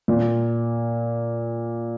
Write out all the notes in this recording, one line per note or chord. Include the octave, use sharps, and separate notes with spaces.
A#2